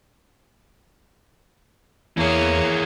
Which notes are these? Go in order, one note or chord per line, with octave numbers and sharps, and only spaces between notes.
E2 E3 A#3 E4 G#4 C#5